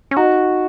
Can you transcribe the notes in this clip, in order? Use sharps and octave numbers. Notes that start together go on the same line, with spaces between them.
C#4
D#4 F#4